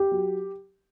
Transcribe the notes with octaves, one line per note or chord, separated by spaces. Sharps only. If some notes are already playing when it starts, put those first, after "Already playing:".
Already playing: G4
F#3